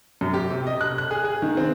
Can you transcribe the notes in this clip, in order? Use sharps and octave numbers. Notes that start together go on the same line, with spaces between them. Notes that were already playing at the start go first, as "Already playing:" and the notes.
F#2
G4
C3
D#5
F#6
F#6
G#4
G#4
D#3
C4